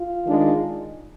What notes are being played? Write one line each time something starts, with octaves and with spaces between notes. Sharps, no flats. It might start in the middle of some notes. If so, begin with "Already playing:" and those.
Already playing: F4
D#3 G#3 D4